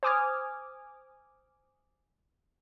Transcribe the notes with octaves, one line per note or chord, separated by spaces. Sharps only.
C5 G#5 D6 D#6 F6 G#6